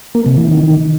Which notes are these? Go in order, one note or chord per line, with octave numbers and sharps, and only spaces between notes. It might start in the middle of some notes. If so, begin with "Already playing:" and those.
A#3
C3
E3
D#3